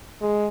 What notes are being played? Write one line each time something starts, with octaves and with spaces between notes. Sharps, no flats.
G#3